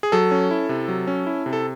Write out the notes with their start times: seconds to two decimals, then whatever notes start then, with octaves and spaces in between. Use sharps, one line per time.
0.03 G#4
0.12 F#3 A4
0.31 C#4
0.51 E4
0.69 C3
0.88 F#3
1.07 C#4
1.26 E4
1.46 C3
1.53 A4